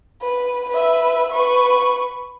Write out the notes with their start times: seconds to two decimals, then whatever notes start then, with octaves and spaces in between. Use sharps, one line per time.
0.21 B4
0.69 B4 E5
1.31 B4 C#6